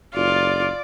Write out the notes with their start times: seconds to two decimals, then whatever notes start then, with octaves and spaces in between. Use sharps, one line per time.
0.15 F#1 F4 D5